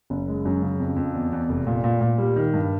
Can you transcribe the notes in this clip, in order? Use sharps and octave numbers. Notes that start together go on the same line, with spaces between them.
F#1
G#3
F#2
C#3
F2
F2
E2
E2
F1
A#2
A#2
A#2
G3
D#3
G2